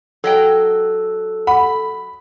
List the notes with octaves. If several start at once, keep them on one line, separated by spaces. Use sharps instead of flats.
F#3 A4 D#5 G5
F#5 B5